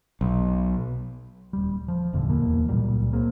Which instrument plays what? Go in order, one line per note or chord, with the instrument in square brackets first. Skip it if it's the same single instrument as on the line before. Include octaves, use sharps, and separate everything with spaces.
[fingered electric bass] B1
[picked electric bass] D#1 G3
F3
G1 E2 A#2 D3
D1 E2 B2 A#3
C#2 A#2 F#3 G3
F#3 G#3 A#3 C4